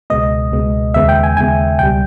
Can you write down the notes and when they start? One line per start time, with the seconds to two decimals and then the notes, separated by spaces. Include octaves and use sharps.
0.10 C#2 B2 G#3 B3 D#5
0.52 C#2 B2 G#3 B3
0.94 D#2 C#3 G#3 B3 E5
1.09 G5
1.23 G#5
1.36 D#2 C#3 G#3 B3 G#5
1.79 C#2 B2 G3 G5